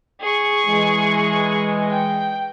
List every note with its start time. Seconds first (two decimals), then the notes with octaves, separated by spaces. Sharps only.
0.21 G#4 C#6
0.66 E3 G#3
1.91 G5